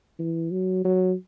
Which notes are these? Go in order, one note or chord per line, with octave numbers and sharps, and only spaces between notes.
E3
F#3
F#3